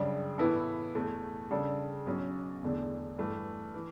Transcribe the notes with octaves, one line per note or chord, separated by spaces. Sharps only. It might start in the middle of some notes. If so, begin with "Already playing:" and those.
Already playing: F#2 C#3 G3 D4
A2 E3 B3 E4 A4
E2 B2 A3
C#3 G3 D4 A4
B1 B2 F#3 C#4
E1 E2 D3 A3 D4
G2 E3 A3
E3